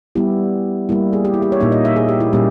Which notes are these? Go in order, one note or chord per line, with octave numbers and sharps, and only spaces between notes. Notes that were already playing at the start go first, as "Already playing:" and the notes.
G3 B3 E4 G4
G3 A#3 E4
G#4
G4
E4
G4
C#5
A#2 A#3 D#4 E5
D#5
E5
G#4
G4
E4
A#2 G3 A#3 C#4 G4